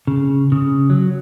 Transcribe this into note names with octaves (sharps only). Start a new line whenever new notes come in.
C#3
C#3
F#3